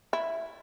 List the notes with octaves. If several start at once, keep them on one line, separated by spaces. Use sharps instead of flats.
E4